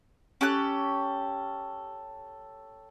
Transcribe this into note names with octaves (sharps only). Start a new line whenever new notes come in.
C#4 G4 A4 F#6